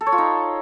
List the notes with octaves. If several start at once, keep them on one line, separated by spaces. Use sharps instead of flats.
A4
C#5
F4
D#4